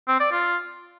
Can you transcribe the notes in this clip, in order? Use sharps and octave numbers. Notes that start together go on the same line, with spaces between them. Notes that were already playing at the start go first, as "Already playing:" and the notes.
C4
D5
F4